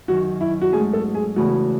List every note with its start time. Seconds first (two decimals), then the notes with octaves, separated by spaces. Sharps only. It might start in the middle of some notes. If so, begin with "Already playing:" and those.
0.08 F#2 D#3 F#3 F#4
0.41 E4
0.61 F#4
0.73 G#2 F#3 A3 C#4 G#4
0.93 A4
1.15 G#4
1.36 E2 C#3 E3 A3 F#4